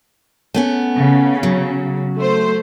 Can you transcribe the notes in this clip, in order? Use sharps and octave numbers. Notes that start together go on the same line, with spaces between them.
A3 B3 C#4
C#3
F#3
A3 C5